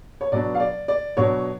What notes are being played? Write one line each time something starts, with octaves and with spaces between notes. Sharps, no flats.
C#5
B2 F#3 B3 D4 D5
F5
D5
D5
B2 F#3 B3 D4 C#5